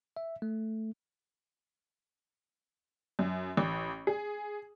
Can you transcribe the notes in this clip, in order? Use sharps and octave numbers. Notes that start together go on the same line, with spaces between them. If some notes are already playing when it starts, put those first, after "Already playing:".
E5
A3
F#2
A1
G#4